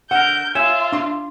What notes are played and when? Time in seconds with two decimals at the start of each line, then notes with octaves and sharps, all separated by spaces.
0.11 D3 A#4 F#5 G6
0.55 F4 C#5 E5 G#5
0.92 D4 C6